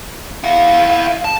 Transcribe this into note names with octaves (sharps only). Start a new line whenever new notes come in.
E4 F5 F#5
A5